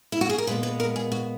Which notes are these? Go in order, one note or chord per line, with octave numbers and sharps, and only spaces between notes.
E4
F#4
G#4
A#4
A#2 G#3 B3 B4
B4
A#4
G#4
F#4